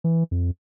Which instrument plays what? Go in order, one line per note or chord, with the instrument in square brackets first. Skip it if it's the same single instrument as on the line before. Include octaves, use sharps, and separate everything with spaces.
[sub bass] E3
F2